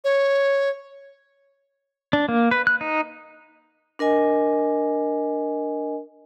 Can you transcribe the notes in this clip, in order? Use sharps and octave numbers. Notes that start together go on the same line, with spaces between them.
C#5
D4
A#3
B4
F#6
D#4
D4 A#4 D#5 G#5